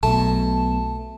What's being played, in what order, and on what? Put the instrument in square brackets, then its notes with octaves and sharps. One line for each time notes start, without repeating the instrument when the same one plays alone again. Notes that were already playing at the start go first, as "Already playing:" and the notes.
[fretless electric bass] B1 B2 [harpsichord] A3 [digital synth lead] A5